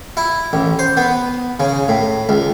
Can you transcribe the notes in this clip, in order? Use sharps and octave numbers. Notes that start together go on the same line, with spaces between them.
E4
A1
C5
B3
C#3
A2
C#2